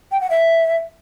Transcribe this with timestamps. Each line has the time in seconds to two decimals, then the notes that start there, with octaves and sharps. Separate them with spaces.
0.12 G5
0.21 F#5
0.30 E5